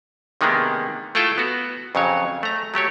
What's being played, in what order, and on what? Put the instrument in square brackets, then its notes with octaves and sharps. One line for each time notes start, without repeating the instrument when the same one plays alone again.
[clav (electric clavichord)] C3 D#3 G#3 A#3 B3 D4
A3 E4 F4 A4 G5 A5
B3 F#4
F2 C#3 F#3 C#5
A3 A#5
F#3 A3 G4 C#5